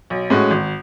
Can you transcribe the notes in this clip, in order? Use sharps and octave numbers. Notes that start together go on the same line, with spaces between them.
B1
A2 G#3 C#4 F#4
G#1